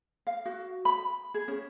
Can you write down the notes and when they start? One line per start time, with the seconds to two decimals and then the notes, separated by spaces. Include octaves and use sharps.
0.27 F5
0.46 F#4
0.85 B5
1.34 G#4
1.48 C#4